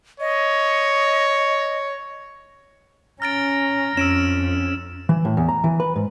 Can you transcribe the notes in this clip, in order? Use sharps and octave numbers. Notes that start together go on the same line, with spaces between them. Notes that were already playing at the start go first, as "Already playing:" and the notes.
C#5 D#5
C#4 A#5 F6 A6 D7
F2 C#4 E6 D7 E7
E3
A2
E2
A#5
E3
B4
G#2